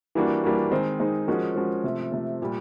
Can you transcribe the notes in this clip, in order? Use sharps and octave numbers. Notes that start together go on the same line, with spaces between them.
E3 G3 A#3 D4 F#4
E3 G3 A#3 D4 F#4
D#3 G#3 C4 D#4
D#3 G#3 C4 D#4
F3 G#3 C#4 F#4 A#4
F3 G#3 C#4 F#4 A#4
C3 F3 A3
C3 F3 A3
A#2 G3